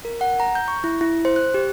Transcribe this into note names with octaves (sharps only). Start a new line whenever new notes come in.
A#4
F#5
A#5
G6
C#6
E4
E4
C5
F#6
G4